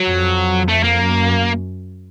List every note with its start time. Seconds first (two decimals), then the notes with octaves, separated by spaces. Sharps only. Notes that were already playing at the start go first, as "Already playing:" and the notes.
Already playing: F#3
0.08 F2
0.68 A3
0.84 A#3
0.99 F#2